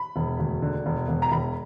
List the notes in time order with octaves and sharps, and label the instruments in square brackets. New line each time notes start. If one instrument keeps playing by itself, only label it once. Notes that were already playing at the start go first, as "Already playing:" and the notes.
Already playing: [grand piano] B5
E1
D2
D3
E1
E1
A#5
E1 B5